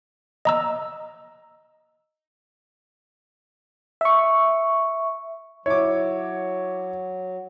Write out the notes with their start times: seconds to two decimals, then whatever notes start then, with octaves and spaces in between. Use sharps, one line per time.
0.45 D#5 A#5 E6
4.01 E5 C#6
5.66 F#3 E4 C#5 D6